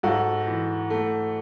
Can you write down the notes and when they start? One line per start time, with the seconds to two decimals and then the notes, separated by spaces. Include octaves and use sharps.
0.03 G#2 F#4 A4
0.47 E3
0.90 A3